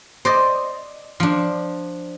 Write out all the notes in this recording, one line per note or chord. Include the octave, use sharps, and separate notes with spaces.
C5 D5 D#5
F3 D4